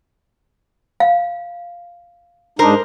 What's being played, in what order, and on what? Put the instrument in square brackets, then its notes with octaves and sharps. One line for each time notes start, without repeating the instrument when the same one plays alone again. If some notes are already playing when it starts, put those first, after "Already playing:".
[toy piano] F5
[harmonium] G#2 D4 D#4 [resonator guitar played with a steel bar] A#4 C5